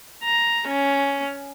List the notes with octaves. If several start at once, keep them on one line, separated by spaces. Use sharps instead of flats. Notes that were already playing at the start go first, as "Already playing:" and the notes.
A#5
C#4